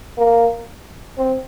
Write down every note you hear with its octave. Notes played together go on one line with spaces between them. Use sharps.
A#3
C4